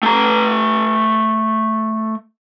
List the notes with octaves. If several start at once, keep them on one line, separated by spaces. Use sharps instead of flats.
A3 A#5